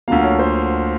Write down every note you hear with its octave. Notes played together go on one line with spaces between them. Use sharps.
D2 D3 F3 A#3 F5
C#5
C5